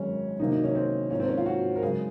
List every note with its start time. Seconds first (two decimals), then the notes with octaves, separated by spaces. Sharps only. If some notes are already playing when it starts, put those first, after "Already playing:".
Already playing: G#1 F#2 D#3 G#3 C#4
0.39 C2 C3 D#3 F#3 A#3 D#4
0.51 D#4
0.64 C#4
0.75 C4
1.10 G#1 G#2 F3 A#3 C#4
1.20 C4
1.28 C#4
1.37 F4
1.46 F#4
1.76 A#4
1.82 F#2 C#3 G#3 G#4